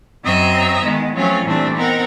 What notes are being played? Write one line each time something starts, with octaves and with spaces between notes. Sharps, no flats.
F#2 F#3 C4 D#5 E5 A#5
D#3 G#3 B3
F3 F#3 A3 C4 C#4 F4
A#2 E3 G3 A3 C4 D4
B3 C4 D#4 A#4 F#5